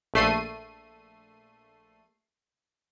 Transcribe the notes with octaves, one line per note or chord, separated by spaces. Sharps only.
A#1 A3 C7 D#7